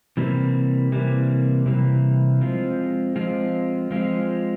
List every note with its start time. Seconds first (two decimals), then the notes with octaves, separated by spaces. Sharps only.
0.17 C3 E3 G3 A#3
0.92 C3 E3 G3 A#3
1.66 C3 E3 G3 A#3
2.41 F3 G#3 C4 F4
3.16 F3 G#3 C4 F4
3.91 F3 G#3 C4 F4